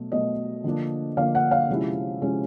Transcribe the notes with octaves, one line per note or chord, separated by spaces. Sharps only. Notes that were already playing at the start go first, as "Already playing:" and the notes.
Already playing: B2 F#3 A3
B2 F#3 A3 D#5
D3 F3 A#3 D4
D3 F3 A#3 D4 F5
F#5
F5
C3 F3 G#3 C#4 E4
C3 F3 G#3 C#4 E4